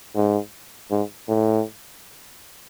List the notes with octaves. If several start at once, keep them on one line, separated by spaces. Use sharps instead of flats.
G#2
G#2
A2